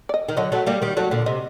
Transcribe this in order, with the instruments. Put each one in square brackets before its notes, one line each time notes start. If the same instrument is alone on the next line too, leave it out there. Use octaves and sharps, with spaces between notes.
[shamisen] D5
D#5
[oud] D#3
[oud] D3 F#3 [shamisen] D#5
[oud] F#3 A3
G3 A#3
[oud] D#3 G3 [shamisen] D5
[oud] F#3 A3
A#2 D3
[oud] C3 [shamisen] D#5